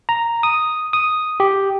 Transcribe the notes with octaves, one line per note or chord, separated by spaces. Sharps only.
A#5
D#6
D#6
G4